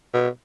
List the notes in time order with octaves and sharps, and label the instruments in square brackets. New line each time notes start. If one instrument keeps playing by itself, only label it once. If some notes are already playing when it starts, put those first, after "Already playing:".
[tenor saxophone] B2